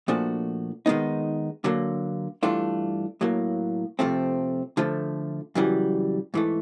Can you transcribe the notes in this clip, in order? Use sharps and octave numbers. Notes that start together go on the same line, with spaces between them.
A#2 F3 A3 D4 F#4
D#3 G#3 B3 D#4
D3 F#3 A#3
G2 E3 A3 D4 F4
A2 F#3 A#3
F2 C3 F3 A3 C4
D3 F3 A3
F#2 C#3 E3 G3
G#2 E3 A3